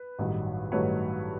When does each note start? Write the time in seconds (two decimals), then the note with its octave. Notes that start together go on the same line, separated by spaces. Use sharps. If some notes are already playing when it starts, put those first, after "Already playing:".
Already playing: B4
0.19 A1 G2 D#3 F#3 A3
0.72 A1 G2 D#3 F#3 A3 B4 C#5